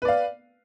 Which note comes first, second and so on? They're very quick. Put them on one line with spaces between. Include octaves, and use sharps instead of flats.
B4 D5 F5